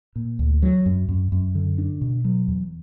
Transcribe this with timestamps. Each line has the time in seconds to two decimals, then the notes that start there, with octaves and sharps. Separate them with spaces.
0.16 A#2
0.39 D2
0.62 F#3
0.86 F#2
1.09 F#2
1.32 F#2
1.55 D3
1.78 D4
2.01 B2
2.24 F#3
2.48 E2